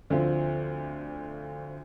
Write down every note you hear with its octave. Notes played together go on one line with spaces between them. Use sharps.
D2 D3 F3 C4 F4